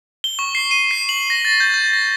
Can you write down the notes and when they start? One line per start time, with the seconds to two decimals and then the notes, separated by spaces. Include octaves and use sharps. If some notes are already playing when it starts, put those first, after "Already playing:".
0.24 G7
0.39 C#6
0.55 C7
0.71 D#7
0.91 C7
1.09 F#7
1.30 A#6
1.45 A6
1.60 G6
1.74 G6
1.94 A#6